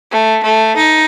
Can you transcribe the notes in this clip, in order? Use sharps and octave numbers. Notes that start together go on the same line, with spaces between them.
A3
A3
D#4